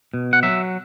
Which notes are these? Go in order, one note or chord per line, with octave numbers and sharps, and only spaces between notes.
B2
F#5
F#3 E5